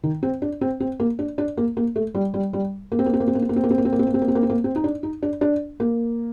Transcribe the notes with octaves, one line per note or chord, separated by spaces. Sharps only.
D#3
C4
D4
C4
C4
A#3
D4
D4
A#3
A#3
A3
G3
G3
G3
A#3
C4
A#3
C4
A#3
C4
A#3
C4
A#3
C4
A#3
C4
A#3
C4
A#3
C4
A#3
C4
A#3
C4
A#3
C4
A#3
C4
D#4
D4
D#4
D4
D4
A#3